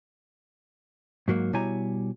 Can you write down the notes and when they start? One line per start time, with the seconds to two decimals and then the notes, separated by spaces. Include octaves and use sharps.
1.28 G#2 F#3 A#3
1.53 B2 G3 E4 C#5 G#5 A#5